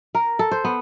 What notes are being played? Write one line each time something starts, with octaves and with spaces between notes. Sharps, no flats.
A#4
A4
C5
B3